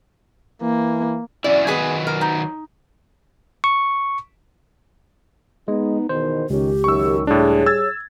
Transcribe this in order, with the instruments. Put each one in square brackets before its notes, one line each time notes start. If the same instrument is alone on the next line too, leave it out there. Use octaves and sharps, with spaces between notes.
[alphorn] E3 [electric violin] A#3
[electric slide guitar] F#3 C#4 E4 [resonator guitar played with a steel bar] D5
[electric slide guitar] D#3 F#3 B4 [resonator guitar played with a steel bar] B3 G#4 G#5
[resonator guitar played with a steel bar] A#4
D#4
[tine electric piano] C#6
[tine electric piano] G#3 [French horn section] B3 D#4
[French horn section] E2 B2 D#3 [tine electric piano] C5
[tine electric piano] C#2 [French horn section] D#3 C#4 [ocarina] G4
[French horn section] F#2 D#3 [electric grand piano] C#6 E6
[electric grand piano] A2 D4 [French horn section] G3 G#4 [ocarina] C#5
[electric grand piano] E6 G#6 A6